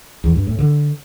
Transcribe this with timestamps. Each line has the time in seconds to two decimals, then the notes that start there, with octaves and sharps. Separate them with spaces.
0.24 E2
0.35 G2
0.47 A2
0.59 D3